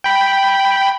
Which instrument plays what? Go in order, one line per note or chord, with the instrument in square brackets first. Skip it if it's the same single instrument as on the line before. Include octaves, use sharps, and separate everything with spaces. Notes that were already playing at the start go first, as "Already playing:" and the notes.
[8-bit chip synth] G5 B5